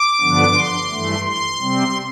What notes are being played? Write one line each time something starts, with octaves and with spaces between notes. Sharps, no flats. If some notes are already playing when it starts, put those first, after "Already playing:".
Already playing: D6
G2 D3 F3 B3 D4
C6
G2 E3 A3
C6
C3 G3 C4